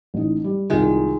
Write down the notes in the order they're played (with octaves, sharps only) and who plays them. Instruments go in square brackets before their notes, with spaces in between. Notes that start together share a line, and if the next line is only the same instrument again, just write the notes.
[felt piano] A1 D#4
G3
[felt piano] C2 F4 [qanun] D#3 G#3